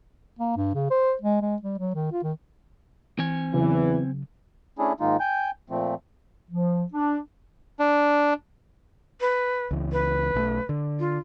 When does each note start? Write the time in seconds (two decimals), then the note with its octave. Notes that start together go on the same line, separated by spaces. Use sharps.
0.39 A#3
0.57 G2
0.74 C#3
0.90 C5
1.21 G#3
1.42 G#3
1.62 G3
1.79 F#3
1.95 D#3
2.12 F4
2.23 D#3
3.19 E3 C4 G#5
3.54 E2 C#3 E3 F#3
4.79 A3 C#4 D4 E4 G#4
5.00 G#2 D#3 G#3 A#3 D#4 F4
5.20 G5 G#5 G6
5.70 A#2 F3 A3 C4
6.50 F3
6.93 D4
7.79 D4
9.21 B4
9.71 C#2 E3
9.92 B4
10.34 B1 E3 A3
10.69 D3
11.00 F4